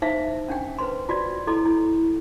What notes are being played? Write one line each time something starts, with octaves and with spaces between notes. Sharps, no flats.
D#4 C5 E5 F5
C#4 D4 G5
B4 C5 C6
F4 F#4 D5 D#5
E4 A4 D#5 C6
E4